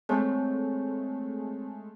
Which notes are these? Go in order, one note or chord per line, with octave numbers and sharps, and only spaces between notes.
G#3 A3 C4 C#5